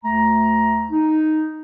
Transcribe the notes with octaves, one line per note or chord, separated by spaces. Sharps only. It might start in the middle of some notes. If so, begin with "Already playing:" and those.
D2 A3 A#5
D#4